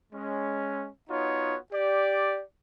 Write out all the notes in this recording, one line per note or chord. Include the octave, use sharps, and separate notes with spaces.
G#3 C#4
B3 D#4 F4 F#4 C#5
G4 D5